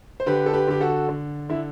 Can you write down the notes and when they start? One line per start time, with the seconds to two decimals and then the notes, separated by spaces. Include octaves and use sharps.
0.20 C5
0.26 D3 G4 B4
0.46 A4
0.53 G4 B4
0.68 D3 G4
0.81 F#4 A4
1.09 D3
1.49 D3 E4